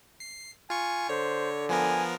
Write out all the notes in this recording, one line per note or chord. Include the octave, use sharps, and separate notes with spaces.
C7
F4 G#5 C#6
D3 C5 C#5
F3 B3 A#4 G#5